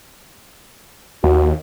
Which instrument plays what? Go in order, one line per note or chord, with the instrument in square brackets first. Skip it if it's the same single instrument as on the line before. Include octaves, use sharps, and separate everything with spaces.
[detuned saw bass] D#2 [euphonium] F#4